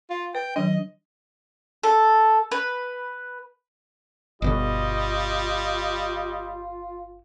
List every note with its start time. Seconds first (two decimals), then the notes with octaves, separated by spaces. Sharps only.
0.10 F4
0.35 B4 G5
0.56 D#3 F#3 D4 D#5
1.83 A4
2.52 B4
4.42 G1 B2 D3 G3 F4 D#5